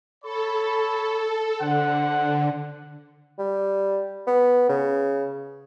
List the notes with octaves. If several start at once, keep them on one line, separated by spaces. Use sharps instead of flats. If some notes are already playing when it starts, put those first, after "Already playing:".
A4 C#5 B5
D3 C5 F#5
G3
B3
C#3